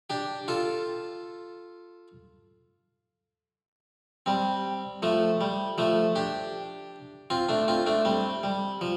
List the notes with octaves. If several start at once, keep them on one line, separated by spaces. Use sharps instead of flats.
D4 G4
F4 A4
G3 C4
F3 A3
G3
F3 A3
D4 G4
C4 F4
A3 D4
C4 F4
A3 D4
G3 C4
G3
F3